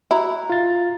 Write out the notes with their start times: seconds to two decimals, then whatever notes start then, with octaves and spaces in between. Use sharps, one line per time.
0.11 E4 F#4 A#5
0.50 F4 A6